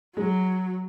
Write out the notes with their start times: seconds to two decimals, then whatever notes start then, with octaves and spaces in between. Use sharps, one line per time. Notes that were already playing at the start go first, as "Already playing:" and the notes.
0.17 F#3 G#3